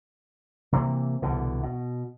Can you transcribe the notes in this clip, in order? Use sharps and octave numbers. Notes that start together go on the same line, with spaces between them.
C3 E3 G#3 A#3
C2 B2 D3 E3
B2